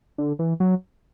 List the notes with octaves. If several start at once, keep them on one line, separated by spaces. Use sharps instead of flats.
D3
E3
F#3